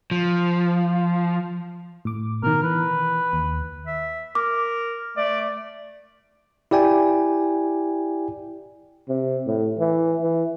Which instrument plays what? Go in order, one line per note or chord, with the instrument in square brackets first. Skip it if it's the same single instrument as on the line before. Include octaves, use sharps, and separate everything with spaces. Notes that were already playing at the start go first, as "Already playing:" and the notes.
[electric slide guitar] F3
[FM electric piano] A2 D6
[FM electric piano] B2 D#3 [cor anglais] A#4
[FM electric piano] E3 [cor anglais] B4
[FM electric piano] D#2
[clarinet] E5
[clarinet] A#4 [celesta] D6
[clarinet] A3 [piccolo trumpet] D5
[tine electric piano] E4 G4 D5 G5 G#5
[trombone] C3
A2
E3
E3